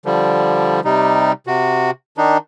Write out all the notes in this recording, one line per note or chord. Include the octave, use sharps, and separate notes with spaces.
D3 F3 G3
C3 G3 D#4
C3 F#4
D#3 D4 D#4